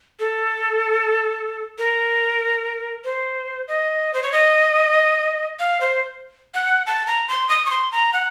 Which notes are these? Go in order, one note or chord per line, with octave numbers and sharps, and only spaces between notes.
A4
A#4
C5
D#5
C5
C#5
D#5
F5
C5
F#5
A5
A#5
C6
D#6
C#6
C6
A#5
F#5